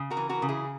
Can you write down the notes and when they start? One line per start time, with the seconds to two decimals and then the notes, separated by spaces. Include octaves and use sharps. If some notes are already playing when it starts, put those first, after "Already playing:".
Already playing: C#3
0.10 F#4 A#4
0.17 E3
0.29 F#4 A#4
0.42 C#3
0.49 E4 G#4